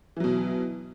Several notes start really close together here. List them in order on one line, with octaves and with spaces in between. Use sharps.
E3 F#3 B2